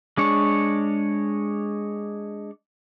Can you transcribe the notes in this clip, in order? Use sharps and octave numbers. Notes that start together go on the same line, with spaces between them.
G#3 D4 C#5